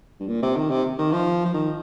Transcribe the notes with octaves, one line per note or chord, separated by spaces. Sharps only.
G2
A#2
C3
D#3
C3
D#3
F3
F3
D#3